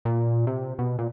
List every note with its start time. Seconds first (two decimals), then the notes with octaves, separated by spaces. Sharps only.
0.05 A#2
0.47 C3
0.79 B2
0.99 A#2